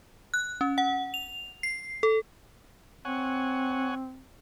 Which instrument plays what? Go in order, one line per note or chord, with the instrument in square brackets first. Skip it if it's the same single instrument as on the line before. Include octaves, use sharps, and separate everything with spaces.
[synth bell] F#6
C#4
F#5
F7
C7
A4
[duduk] C4 [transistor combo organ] C#5 F#5 G#5